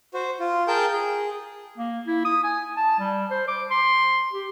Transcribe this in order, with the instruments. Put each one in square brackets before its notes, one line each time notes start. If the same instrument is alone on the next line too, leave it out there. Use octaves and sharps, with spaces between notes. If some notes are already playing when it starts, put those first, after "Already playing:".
[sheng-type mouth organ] F#4 C5
F4
G#4 A#4 G5 A5 G6
G#4
[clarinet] A#3
E4
D#6
G#5
A5
G3
C5
D6
C6
G4